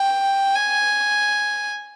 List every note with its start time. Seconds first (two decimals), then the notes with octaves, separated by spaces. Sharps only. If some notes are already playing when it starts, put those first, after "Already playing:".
Already playing: G5
0.56 G#5